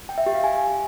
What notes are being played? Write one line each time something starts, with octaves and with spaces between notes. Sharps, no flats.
G5
E5
G4
F5
G#5